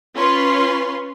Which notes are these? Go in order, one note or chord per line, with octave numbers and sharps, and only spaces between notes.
C#4 F4 B4 C6